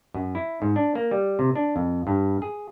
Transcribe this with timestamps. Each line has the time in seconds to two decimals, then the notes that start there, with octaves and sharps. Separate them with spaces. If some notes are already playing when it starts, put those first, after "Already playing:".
0.14 F#2
0.35 E4
0.62 G#2
0.76 D4
0.95 A#3
1.11 G3
1.39 C3
1.56 D4
1.76 F2
2.07 G2
2.42 G#4